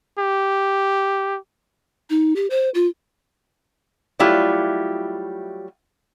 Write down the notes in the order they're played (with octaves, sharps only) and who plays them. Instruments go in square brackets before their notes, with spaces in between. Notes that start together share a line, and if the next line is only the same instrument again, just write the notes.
[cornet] G4
[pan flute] D#4
G4
C5
F4
[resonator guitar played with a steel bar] F#3 G3 A3 E4 F4 G4